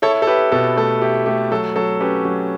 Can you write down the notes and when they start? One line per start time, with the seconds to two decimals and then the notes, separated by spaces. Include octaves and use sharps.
0.02 E4 A4 C#5
0.22 A4
0.27 E4 G4 B4
0.52 B2 A4
0.76 A3 A4
1.01 E4 G4
1.26 A3 G4
1.51 F#3 A4
1.76 F#3 A4
2.00 C#4 G4 B4
2.25 F#3